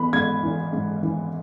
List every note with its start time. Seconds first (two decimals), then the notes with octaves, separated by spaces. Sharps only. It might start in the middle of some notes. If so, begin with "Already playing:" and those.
Already playing: E3 B3 B5
0.13 G#2 G#6
0.43 E3
0.73 G#2
1.03 E3